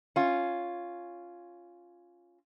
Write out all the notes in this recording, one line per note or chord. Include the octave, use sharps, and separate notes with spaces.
C#4 F4